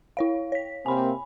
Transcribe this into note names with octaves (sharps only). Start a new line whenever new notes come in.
E4 C#5 F5
C#5 B6
C3 A#3 C4 G#5 B5